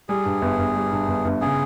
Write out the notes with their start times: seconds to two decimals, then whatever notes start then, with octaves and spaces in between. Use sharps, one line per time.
0.09 G3 G#4
0.25 G2
0.42 G1
0.59 G1
0.75 G3
0.92 G2
1.08 G1
1.25 G1
1.41 C#3 G#4